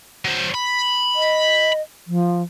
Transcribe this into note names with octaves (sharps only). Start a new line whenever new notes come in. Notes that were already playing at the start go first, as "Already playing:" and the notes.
F#3 C5
B5
D#5
F3